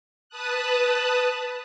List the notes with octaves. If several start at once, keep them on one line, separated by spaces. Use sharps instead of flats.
B4 A5 D#6 F#6